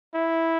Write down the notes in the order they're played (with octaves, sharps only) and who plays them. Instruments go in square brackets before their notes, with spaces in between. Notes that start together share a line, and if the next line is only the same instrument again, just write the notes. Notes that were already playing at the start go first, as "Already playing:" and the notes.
[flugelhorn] E4